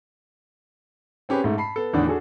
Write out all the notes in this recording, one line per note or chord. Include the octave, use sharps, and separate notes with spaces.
C4 C#4 G4 G#4 B4
G#2 A3
A5 B5 C7
B3 A4
E2 A2 D3 D#3 D4
D4 F#4 G#4 A4